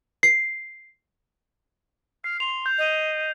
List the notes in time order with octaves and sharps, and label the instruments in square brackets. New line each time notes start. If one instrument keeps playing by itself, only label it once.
[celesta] C7
[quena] F6 [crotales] C7
[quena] C6 [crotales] F7
[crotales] G6
[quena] D#5